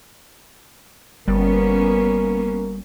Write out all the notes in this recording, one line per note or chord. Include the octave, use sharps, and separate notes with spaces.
G1 G3 A#3 B3 C#4 A#4